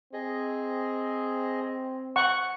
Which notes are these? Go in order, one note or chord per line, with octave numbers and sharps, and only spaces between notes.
C4 G#4 D#5
F#5 C#6